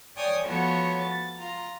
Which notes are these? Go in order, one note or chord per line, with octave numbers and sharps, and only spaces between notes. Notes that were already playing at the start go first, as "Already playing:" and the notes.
C#5 D5 G5 G#5 D#6
F3 A3 B3 F4 F#4 C#5
A6
F4 A#5